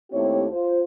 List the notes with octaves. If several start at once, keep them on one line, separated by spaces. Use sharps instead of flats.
D#2 A3 C4 E4 G4 C#5
F4 C5